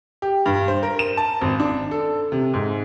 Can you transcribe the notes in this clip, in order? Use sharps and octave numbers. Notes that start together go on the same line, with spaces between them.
G4
G2
C5
A#4
E7
A5
G#1
D4
A4
C3
G#2